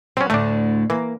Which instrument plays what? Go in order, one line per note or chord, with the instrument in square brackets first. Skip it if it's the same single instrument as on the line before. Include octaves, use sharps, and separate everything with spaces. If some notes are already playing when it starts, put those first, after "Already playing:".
[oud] F#3 [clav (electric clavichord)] C4 C#4
[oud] D2 A2 D3 [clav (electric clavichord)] A3 D4
[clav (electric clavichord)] E3 [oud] A#3